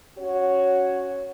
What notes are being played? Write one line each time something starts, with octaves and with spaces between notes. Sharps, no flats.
C#4 F#4 C#5